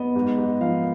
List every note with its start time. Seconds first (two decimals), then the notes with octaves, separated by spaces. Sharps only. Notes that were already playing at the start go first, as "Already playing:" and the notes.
Already playing: B3 D#5
0.15 G#2
0.38 G#2
0.61 F3 F5